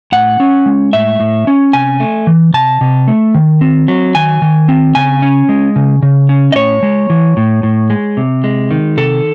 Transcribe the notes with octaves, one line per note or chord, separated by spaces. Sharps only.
A2 F#5
C#4
G#3
A2 E5
A2
C#4
C3 G#5
A3
E3
C3 A5
C3
A3
D#3
C4
F#3
D#3 G#5
D#3
C4
C#3 G#5
C#4
G#3
C#3
C#3
C#4
D#5
A2 C#5
G#3
E3
A2
A2
G#3
C3
G#3
D#3
C3 A4